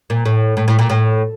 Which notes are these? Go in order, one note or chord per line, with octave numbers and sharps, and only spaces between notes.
A#2
A2
A2
A2
A#2
A2